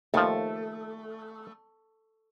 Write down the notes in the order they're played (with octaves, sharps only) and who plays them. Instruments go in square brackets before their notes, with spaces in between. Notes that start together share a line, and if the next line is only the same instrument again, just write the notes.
[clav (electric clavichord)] D#2 F3 [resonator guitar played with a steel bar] A3